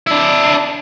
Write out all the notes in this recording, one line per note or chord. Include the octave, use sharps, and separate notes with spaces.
D4 E4